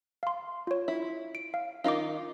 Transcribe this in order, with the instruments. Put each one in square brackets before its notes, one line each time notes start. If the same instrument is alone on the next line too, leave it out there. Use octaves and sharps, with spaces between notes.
[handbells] F5 C6
F4 C#5
[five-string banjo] E4
[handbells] D7
F5
[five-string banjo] D#3 D#4 F4 [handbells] F5 D6